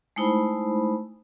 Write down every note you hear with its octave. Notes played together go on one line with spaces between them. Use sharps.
G#3 A3 D#4 E4 C5 B5